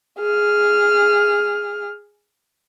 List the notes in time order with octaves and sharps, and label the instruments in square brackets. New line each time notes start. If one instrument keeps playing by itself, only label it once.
[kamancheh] G#4 F6